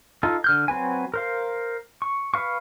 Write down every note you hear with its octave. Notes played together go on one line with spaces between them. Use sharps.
D#4 F4 A4
D3 F6 G6
F#3 C4 B4 G#5
A#4 C5 F5
C#6
B4 F5 C#6